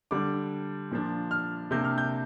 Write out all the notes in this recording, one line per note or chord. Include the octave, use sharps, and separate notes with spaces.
D3 G3 D4 D6
A#2 F3 A#3 D4
F6
C3 A#3 D4 G6
F6
G6